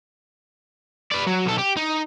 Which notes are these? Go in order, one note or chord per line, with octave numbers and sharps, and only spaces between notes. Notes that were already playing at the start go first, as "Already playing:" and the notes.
B4 D5
F#3
B1 A4
G4
D#4